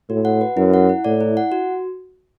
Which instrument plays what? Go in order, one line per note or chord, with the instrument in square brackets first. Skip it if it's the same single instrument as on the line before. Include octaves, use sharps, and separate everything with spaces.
[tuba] A2 [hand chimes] F#4
[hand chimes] F#5
B4
[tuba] F#2 [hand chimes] E4
[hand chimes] F#5
E4
[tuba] A2 [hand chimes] D5
[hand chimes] E4
F#5
F#4